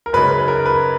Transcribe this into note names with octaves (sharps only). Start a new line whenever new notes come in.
A#4
F#2 C#3 G#3 D#4 B4
B4
A#4
B4